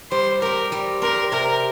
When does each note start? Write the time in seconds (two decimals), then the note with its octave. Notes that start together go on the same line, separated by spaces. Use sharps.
0.11 G3 C5
0.41 C4 G4 A#4
0.72 G3
1.02 C4 G4 A#4
1.32 C3 A#4